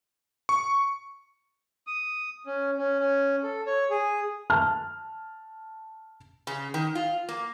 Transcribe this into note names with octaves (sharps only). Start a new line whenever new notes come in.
C#6
D#6
C#4
C#4
C#4
A4
C#5
G#4
A5 F6
C#3
D#3
F4
A#3